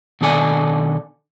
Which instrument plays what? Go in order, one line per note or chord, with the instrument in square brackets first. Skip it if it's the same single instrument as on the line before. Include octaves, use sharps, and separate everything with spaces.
[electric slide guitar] B2 D#3 D4 A4 D5 G#5